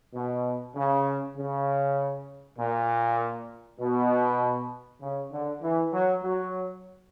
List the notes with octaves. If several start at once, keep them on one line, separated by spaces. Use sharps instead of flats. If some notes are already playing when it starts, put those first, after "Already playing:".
B2
C#3
C#3
A#2
B2
C#3
D3
E3
F#3
F#3